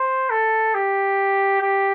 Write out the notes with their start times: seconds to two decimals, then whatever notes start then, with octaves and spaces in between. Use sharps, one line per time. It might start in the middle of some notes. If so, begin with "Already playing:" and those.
Already playing: C5
0.30 A4
0.74 G4
1.61 G4